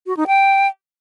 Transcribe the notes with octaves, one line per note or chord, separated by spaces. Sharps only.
F#4
D#4
G5